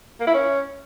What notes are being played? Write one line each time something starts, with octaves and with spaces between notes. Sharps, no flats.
A#3
E4
C#4